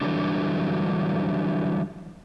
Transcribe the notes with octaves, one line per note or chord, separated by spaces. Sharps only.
D3 E3 F#3 G3 D4